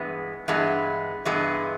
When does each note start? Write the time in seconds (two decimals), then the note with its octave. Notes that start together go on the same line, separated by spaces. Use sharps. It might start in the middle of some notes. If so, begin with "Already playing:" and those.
Already playing: G2 E3 G#3 B3
0.48 G2 E3 G#3 B3
1.25 G2 E3 G#3 B3